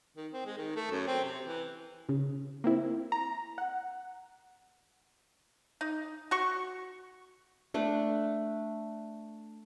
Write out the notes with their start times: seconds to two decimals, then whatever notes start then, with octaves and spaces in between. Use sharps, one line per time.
0.17 D#3
0.32 C4
0.46 G#3
0.58 D#3
0.76 A3
0.91 F#2
1.07 C4
1.24 C3
1.46 E3
2.09 C#3
2.64 A#3 C4 E4
3.12 A#5
3.58 F#5
5.81 D#4
6.31 F#4 C#6
7.74 A3 D4